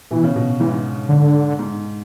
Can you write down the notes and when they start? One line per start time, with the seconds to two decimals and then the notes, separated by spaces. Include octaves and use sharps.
0.11 B2 E3
0.23 C#3
0.36 B2
0.60 G#2 E3
1.09 D3
1.59 G#2